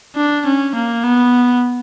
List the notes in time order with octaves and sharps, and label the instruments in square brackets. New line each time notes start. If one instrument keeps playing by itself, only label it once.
[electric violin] D4
C#4
A#3
B3